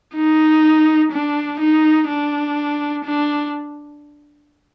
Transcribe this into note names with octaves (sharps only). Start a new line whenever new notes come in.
D#4
D4
D#4
D4
D4